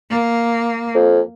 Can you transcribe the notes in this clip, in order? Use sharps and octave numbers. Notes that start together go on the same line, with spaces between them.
A#3
F2